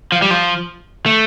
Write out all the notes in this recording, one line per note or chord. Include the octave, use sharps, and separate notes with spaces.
F3
G3
F3
A3